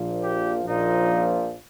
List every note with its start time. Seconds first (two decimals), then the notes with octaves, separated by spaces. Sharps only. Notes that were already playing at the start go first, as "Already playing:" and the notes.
Already playing: A#1 A#2 F3
0.20 G4
0.65 A#1 A#2 F3 D#4